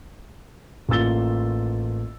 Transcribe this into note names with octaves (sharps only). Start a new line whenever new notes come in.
A1 A#3 F4 E6 A6 G7